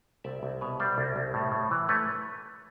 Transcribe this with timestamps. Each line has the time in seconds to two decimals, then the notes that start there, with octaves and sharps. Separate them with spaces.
0.24 C2 D5 E5
0.43 C2
0.61 B2 B4 C#5
0.80 G3 C5 D5
0.98 C2
1.16 C2
1.34 A2
1.52 A2
1.71 E3
1.89 A3 B4 C#5